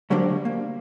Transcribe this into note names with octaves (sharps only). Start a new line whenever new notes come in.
D3 F#3 G3 A#3 D4 C5
A#3